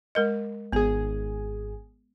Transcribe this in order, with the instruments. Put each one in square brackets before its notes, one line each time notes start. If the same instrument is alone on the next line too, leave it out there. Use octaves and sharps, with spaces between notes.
[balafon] G#3 A#4 D#5
[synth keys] G#1 G#4 [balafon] B3 G#5